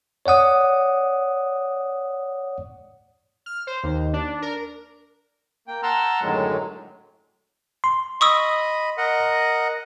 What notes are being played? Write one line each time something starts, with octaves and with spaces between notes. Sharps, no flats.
C#5 D5 F#5 D#6
F6
C5
D#2
D4
A#4
A#3 G5
F#5 A5 A#5 C6 E6 F6
F#2 A2 D3 D#3 F#3 G#3
C6
D#5 B5 C#6 D#6 E6
A#4 D#5 F#5